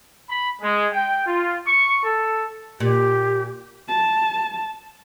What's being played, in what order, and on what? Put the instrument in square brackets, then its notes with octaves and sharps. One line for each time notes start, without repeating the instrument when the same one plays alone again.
[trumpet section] B5
G#3
G5
F4
C#6
A4
[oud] A#2 [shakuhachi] G4
[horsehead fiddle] A5